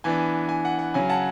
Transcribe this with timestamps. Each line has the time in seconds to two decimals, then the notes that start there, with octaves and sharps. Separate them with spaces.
0.04 E3 B3 D4 G#5
0.49 G#5
0.65 F#5
0.79 F#5
0.94 C#3 F#3 C#4 G#5
1.09 F#5 A5